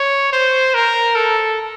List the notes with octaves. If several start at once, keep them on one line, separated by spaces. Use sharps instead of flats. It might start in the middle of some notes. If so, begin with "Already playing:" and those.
Already playing: C#5
C5
A#4
A4